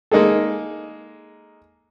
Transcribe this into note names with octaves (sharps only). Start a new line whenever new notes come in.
G#3 A#3 D#4 G#4 A4